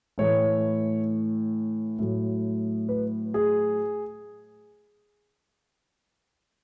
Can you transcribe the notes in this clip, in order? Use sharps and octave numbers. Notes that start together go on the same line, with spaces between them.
A2 E3 A3 C#5
A2 F#3 A3
B4
G#4